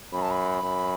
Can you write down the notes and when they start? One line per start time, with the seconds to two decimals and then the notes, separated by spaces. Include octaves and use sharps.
0.13 F#2 B5
0.22 A5
0.30 B5
0.63 F#2